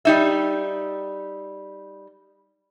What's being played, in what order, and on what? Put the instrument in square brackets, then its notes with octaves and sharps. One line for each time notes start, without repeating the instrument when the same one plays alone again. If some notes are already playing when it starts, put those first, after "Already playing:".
[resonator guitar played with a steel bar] G3 D#4 E5